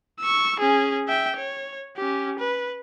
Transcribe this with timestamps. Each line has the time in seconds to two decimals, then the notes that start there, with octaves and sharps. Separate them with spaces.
0.21 C#6 E6
0.60 C#4 G#4
1.08 E5 G5
1.37 C#5
1.96 C#4 G4
2.39 B4